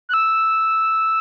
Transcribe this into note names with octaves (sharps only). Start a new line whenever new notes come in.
F#6
E6